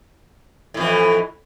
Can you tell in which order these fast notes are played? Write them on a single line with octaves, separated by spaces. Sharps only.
A2 F2 E3